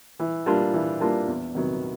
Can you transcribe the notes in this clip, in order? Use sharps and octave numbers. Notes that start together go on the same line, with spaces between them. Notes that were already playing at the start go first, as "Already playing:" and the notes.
E3
G3 A#3 D4 F4
E3
G3 A#3 D4 F4
E2
C3 D#3 F#3 B3